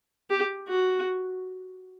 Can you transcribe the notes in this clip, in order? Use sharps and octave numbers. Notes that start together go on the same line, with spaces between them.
G4
F#4